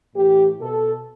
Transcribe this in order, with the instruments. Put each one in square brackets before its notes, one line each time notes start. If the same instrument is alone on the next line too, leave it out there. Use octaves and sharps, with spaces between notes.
[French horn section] A2 E3 G4
B2 A4